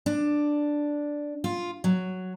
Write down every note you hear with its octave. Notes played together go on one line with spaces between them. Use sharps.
D4
F4
F#3